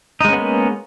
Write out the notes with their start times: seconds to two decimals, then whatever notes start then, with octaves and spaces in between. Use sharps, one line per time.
0.21 D#4
0.25 G#3
0.29 C#4
0.33 B3
0.37 A#3